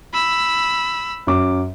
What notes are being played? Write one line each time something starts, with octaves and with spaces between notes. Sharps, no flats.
B5 E6
F#2 C#4 D6